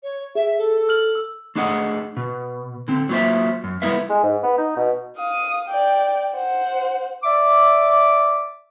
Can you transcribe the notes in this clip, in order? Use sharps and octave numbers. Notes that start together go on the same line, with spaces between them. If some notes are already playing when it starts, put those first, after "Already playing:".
C#5
G#4 E5
A4
F6 F#7
E6
A3 D4 G#4 D#5 F#5
B2
D3 C4
F#3 A#3 F4 C5 E5
F#2
G3 B3 E4 A#4 B4 E5
G#3
G#2
B3
D#4
B2
F5 D#6
D5 G5
C5 F#5
D5 E5 D6